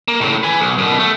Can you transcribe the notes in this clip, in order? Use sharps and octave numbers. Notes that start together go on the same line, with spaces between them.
A#3
A2 C#3
B4 G#5
B1
F#2 B2
A3